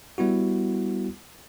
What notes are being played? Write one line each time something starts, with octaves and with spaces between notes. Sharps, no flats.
G3 B3 E4 F#4